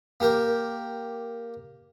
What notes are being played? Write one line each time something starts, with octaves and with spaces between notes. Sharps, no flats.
A#3 G4 A#4 G5